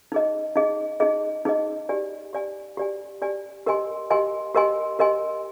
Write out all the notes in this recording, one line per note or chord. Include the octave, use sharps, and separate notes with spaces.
D#4 G#4 D#5
D#4 G#4 D#5
D#4 G#4 D#5
D#4 G#4 D#5
G4 D5 G#5
G4 D5 G#5
G4 D5 G#5
G4 D5 G#5
G4 A#4 D#5 G#5 C6
G4 A#4 D#5 G#5 C6
G4 A#4 D#5 G#5 C6
G4 A#4 D#5 G#5 C6